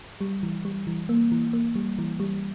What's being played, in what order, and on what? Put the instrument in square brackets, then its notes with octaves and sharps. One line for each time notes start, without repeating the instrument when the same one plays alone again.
[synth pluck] G3
E3
G3
E3
A#3
E3
A#3
G3
E3
G3